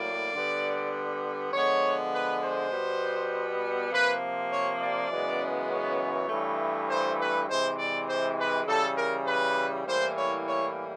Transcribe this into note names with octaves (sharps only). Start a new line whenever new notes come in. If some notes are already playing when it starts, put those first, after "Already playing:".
Already playing: A2 F#3 A#3 D5
D3 G3 B3
D3 F3 G#3 B3 C#5
B4
C5
B2 G3 B3
C3 F3 A#3 B4
C#5
D5
F#2 C#3 E3 G#3 B3
C#5
G2 E3 A3
C5
B4
C3 E3 G#3 C5
D5
C5
B4
C#3 E3 G3 A4
A#4
B4
A2 E3 G3 A#3 C5
C#5
C#5